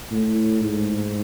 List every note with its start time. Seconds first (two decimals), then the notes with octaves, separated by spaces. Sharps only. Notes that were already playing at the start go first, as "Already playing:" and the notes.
0.11 A2
0.63 G#2